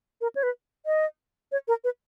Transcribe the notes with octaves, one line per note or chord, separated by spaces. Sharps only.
A#4
C#5
B4
D#5
C#5
A#4
B4